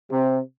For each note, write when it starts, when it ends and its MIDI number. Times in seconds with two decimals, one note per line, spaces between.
0.10 0.38 48